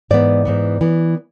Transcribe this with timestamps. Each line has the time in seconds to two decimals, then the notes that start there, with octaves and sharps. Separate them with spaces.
0.11 G#2 E3 B3 D5
0.45 G#2 E3 B3
0.81 E3 B3